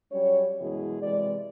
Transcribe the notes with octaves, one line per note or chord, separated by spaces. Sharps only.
F#3 G3 C#4 C#5
F#2 B2 E3 G#3 E4 G#4
C3 E3 G#3 D5